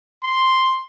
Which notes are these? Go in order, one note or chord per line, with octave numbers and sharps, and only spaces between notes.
C6